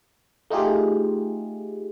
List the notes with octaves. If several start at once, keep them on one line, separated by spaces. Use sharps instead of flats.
A3 D#4 F4 G4 G#4